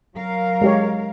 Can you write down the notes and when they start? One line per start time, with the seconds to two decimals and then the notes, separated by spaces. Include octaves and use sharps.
0.14 F#3 A#4 F5
0.62 G#3 G4 C#5